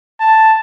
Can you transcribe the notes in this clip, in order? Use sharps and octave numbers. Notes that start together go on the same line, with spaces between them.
A5